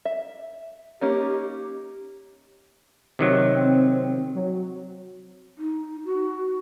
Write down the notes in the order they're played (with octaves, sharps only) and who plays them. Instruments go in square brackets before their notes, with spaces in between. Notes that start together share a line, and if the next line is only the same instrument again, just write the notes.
[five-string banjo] E5
[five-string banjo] A#3 C#4 D#4 [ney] G4
[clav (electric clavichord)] C3 D#3 F#3
[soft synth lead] C4
F#3
[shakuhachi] D#4
F#4